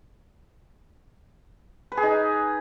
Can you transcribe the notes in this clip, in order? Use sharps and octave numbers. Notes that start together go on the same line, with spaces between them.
B4
G#4
D#4